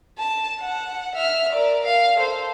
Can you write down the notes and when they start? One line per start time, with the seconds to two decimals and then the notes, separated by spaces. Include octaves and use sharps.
0.18 A5
0.60 F#5
1.15 E5 F6
1.52 A#4 D5
1.83 F5
2.15 A4 C5